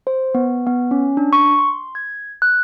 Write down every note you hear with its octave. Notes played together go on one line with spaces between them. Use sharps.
C5
B3
B3
C#4
D4
C#6
C6
G#6
F#6